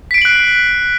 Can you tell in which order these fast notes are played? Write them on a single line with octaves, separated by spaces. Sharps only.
B6 D7 C7 F#7 F#6